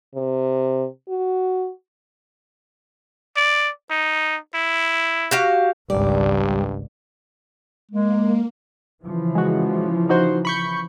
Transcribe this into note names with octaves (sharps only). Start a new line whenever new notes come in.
C3
F#4
D5
D#4
E4
F#4 G4 F5
G#1 C#2 G2 G3 D5
G#3 A#3
C#3 E3 F3
G#3 F#4
D#4 F#4 C5
B5 C#6 G6